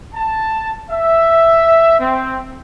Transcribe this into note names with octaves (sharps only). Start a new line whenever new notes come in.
A5
E5
C4